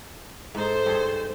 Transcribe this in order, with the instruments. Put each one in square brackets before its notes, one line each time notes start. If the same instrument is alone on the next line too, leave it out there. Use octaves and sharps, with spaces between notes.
[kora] G#2 D#4 [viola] A4 C5
[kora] G2 G#4